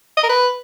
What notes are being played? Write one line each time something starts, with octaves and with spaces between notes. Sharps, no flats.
D#5
A#4
B4